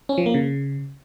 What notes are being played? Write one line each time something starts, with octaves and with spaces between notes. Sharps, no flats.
C#4
F3
A#3
C#3